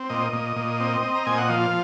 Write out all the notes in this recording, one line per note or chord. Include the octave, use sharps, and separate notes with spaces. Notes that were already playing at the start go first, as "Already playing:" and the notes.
Already playing: C4
A#2 D#5
A#2
A#2
C4
C4
A#5
A#2 G#5
F#5
F3 F5